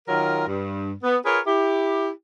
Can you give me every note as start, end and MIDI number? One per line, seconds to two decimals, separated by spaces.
0.08 0.47 51
0.08 0.47 54
0.08 0.47 65
0.08 0.47 70
0.47 0.92 43
1.04 1.17 59
1.25 1.40 65
1.25 1.40 68
1.25 1.40 70
1.25 1.40 71
1.25 1.40 73
1.46 2.09 64
1.46 2.09 67